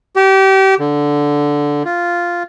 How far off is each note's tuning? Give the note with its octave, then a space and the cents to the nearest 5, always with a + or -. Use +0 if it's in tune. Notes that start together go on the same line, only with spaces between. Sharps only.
G4 -30
D3 -5
F4 -5